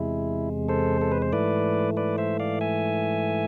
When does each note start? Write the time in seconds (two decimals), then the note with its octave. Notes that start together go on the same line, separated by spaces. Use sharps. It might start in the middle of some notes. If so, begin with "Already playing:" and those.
Already playing: E2 C3 G#3 E4
0.68 A4 C5
1.01 A4
1.12 B4
1.22 C5
1.32 G#2 E3 A3 B4 D5
1.97 B4 D5
2.18 C5 E5
2.40 D5 F5
2.61 E5 G#5